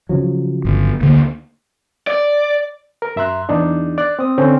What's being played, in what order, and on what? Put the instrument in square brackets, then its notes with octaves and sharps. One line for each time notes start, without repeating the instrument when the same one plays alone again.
[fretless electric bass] C#3 F3 F#3
[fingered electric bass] G1
D2 D3 A#3
[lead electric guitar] D5
[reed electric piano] A#4
F#2 E5 A#5 C6 F#6
E2 D4 D#4
D5 F#6
C4 D#6
D3 C4 C#4